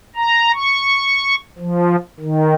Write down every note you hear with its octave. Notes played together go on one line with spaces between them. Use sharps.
A#5
C#6
F3
D#3